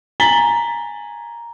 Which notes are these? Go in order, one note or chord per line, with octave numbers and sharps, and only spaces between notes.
G#5 A#5 A6 B6 F#7 G7